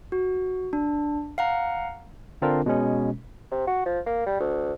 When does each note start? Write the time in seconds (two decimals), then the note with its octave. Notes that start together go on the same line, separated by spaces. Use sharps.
0.12 F#4
0.73 D4
1.38 F5 F#5 A#5
2.42 D3 C4 D4 F4 A#4
2.66 B2 G#3 C#4
3.51 C3
3.67 F#4
3.86 F3
4.06 A#3
4.26 G3
4.40 D2